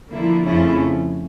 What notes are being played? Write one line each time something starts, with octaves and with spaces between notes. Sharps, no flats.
D3 F3 A#3 E4
F2 C#3 F3 A3 C#4 E4